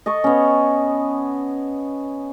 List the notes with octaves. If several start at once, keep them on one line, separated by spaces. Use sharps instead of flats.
D#5 A5 C#6
B3 C#4